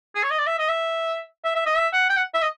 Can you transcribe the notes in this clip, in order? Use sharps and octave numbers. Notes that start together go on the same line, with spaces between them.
G#4
C#5
D#5
D5
E5
D#5
E5
E5
E5
D#5
E5
F#5
G5
F#5
E5
D#5